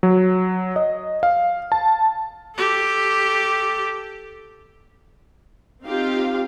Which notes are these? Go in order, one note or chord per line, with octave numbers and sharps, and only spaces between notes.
F#3
D#5
F5
A5
G4 A4
C4 D#4 F4 G4 F5